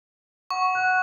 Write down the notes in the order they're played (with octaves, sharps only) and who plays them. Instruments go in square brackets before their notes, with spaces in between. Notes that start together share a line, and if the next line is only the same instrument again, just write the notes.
[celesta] F#5 [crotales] C#6
[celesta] F#5 F#6